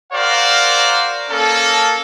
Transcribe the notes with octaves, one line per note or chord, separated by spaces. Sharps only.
F#4 A#4 C5 D5 F5
A#3 C#4 A4